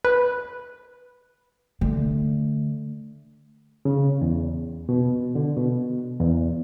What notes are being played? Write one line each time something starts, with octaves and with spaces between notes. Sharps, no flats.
B4
D3 A3
C#3
E2
B2
D3
B2
E2